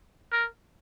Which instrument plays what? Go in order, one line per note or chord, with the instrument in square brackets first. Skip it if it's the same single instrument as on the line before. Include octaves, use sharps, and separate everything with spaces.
[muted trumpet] A#4